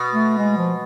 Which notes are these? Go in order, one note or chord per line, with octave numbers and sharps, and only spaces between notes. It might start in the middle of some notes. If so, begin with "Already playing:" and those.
Already playing: B2
A3
G#3
F3